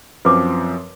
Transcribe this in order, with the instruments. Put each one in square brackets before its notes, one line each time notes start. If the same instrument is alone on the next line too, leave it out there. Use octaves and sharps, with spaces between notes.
[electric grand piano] F#2 F3 C4 [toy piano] B4 D6